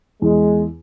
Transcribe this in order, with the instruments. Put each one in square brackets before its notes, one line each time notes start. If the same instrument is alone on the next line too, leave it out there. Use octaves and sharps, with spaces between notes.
[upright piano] E2 [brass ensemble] G#3